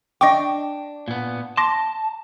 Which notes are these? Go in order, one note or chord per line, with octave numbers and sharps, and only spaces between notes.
D4 D#5 G5 C#6 D6
A#2 B3
A5 C6 D6 A#6